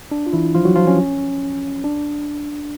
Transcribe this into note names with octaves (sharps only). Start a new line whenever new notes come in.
D4
F4
E3 E4
F3 F4
F#3 F#4
F3 F4
C#4
D4